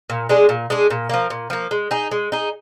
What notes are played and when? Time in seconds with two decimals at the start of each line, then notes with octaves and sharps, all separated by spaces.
0.10 A#2
0.29 G#3 D4 G#4
0.49 A#2
0.70 G#3 D4 G#4
0.90 A#2
1.09 F3 A#3
1.30 A#2
1.50 F3 A#3
1.71 G#3
1.91 D#4 G#4
2.11 G#3
2.32 D#4 G#4